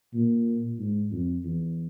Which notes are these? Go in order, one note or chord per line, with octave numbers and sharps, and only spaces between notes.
A#2
G#2
F2
E2